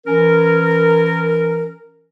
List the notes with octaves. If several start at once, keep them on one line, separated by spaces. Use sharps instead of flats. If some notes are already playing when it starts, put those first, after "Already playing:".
E3 C#4 A#4